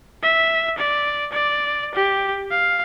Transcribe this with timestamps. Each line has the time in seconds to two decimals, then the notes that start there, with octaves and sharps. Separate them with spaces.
0.23 E5
0.78 D5
1.32 D5
1.95 G4
2.51 F5